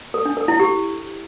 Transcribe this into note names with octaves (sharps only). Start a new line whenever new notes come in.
A4
D4
A4
E4
G4